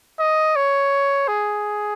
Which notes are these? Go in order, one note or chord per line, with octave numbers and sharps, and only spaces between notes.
D#5
C#5
G#4